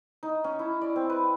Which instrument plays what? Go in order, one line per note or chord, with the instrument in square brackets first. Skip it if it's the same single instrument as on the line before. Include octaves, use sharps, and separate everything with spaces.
[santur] D#4
C#4
E4
D5
C4
B4